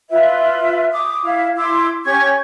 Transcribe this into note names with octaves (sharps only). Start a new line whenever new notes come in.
F4 B4 E5
D6 D#6
E4 F5
E4 C6 D6 E6
C#4 G4 C#6 G#6